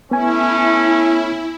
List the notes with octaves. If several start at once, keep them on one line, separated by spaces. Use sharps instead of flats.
A3 B3 C#4 E4 G#5